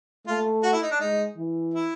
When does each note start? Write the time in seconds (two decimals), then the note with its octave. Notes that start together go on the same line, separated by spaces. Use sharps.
0.27 A3 F4
0.63 F#4
0.72 E4
0.82 D#4
0.91 D4
1.00 G#3 D#4
1.37 E3
1.74 E4